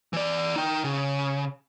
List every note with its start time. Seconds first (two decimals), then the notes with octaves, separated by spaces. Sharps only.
0.13 E3 D5
0.56 D#4 G5
0.84 C#3